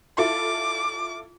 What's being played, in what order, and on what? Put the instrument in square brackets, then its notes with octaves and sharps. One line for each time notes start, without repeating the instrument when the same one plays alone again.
[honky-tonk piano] E4 F4 A4 [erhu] D6